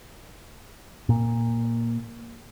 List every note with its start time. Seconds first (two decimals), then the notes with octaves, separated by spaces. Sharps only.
1.09 A#2